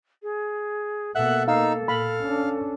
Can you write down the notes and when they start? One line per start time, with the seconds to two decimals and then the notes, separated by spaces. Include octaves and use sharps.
0.23 G#4
1.15 B2 A#3 A4 E5 F#5 F#6
1.48 A#3 D#4 F5 E6
1.88 A#2 F5 B5
2.22 C#4 D4